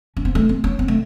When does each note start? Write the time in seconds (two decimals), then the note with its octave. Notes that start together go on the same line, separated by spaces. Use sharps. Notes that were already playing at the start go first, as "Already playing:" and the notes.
0.17 C#4
0.25 C4
0.35 A3
0.49 C4
0.64 C#4
0.79 C4
0.88 A3